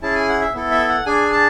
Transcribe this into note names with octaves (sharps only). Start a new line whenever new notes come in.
C#4 E4 G#4 A5
G#5
F#5
E5
B3 E4 A4
E5
F#5
D4 G#4 G#5
A5